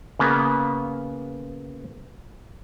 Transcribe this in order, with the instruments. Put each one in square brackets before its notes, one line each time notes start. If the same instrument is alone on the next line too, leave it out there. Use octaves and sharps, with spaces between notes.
[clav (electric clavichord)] C#3 A#3 B3